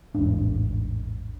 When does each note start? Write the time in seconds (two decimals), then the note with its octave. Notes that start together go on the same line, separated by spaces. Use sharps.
0.15 E1 A1 G#2 D4